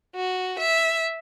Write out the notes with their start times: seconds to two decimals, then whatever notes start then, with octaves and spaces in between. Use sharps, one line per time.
0.16 F#4
0.59 E5